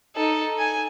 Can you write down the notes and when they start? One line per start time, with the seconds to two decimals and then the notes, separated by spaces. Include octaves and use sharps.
0.16 D#4 A4
0.58 G#5